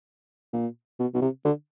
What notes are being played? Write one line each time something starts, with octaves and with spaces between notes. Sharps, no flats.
A#2
B2
B2
C3
D3